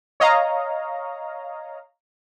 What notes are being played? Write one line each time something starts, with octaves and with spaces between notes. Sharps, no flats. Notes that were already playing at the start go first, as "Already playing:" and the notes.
C#5 D#5 F5 A#5